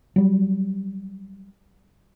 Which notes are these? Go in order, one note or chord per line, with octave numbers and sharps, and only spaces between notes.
F#3 G3